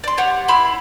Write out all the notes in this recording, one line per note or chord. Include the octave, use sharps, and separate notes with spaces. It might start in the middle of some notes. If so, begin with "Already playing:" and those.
D5 C6
G4 C#5 F#5
E4 B5 C6